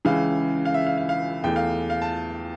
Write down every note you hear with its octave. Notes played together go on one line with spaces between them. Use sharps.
C#2 C#3 E3 F5
F5
E5
F5
F5
F5
E2 E3 A3 G5
F5
F5
A5